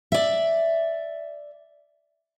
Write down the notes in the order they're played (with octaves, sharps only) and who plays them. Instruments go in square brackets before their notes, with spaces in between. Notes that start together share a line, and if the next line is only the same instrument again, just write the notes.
[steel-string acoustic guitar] D5 E5